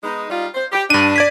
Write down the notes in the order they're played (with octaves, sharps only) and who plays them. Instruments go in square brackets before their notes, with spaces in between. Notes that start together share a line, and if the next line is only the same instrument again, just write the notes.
[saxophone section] G#3 B3 D#4
G3 D#4 F4
C5
G4
[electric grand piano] G2 D#7 [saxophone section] D4
[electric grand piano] D5 G#6 B6